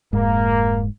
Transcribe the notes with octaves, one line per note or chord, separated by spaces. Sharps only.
F1 G#2 A#3